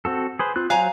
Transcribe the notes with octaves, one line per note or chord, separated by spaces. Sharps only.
C4 F#4 A4
G#4 B4 C5
C4 F4 F#6
F#3 C5 F5 G#5 A#5 F#6